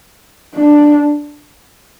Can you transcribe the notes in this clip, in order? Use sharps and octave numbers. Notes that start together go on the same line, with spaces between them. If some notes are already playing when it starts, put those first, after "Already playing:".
D4